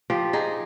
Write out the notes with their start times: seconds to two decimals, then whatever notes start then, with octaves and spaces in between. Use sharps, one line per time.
0.10 F3 G4
0.33 D#4 G#4